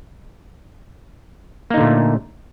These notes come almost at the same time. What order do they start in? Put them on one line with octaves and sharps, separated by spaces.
A#3 D#4 D3 A#2 A3